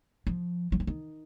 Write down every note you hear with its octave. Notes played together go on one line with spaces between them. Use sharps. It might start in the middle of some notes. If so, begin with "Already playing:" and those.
F3
F#3
F3
D#3